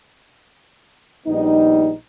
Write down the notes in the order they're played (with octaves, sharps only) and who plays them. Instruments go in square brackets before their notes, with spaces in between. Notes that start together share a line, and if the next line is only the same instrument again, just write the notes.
[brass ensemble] A#1 G3 B3 D#4